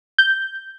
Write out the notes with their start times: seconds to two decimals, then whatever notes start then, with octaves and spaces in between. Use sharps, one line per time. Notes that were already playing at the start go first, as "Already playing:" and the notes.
0.18 G6